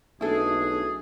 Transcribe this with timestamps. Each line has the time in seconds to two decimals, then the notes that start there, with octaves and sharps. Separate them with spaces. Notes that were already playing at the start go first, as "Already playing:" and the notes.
0.21 B1 A3 D4 E4 G#4 A4